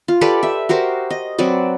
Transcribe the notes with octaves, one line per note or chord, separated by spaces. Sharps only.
F4
G4 A4 B4 D5
E5
F#4 G4 A#4 C5
D#5
F#3 C4 B4 D5